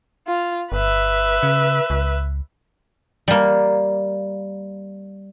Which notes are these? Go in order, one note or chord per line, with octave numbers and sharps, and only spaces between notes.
F4
G1 B4 E5
C#3
C#2
G3 A#3